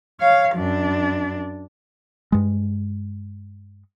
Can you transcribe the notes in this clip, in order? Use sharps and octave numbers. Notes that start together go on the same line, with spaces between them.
C#5 F5
F#2 D4
G2 G#3